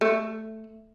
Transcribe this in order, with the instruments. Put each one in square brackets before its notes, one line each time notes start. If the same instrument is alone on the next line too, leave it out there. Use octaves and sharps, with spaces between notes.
[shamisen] A3